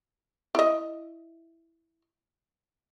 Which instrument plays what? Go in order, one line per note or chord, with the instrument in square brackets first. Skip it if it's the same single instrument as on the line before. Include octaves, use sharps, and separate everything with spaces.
[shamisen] E4 D#5